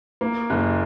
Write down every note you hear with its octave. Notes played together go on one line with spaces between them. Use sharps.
A#3
F#1